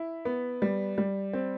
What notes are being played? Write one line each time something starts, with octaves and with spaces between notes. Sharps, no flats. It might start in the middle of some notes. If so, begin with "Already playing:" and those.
Already playing: E4
B3
G3
G3
C4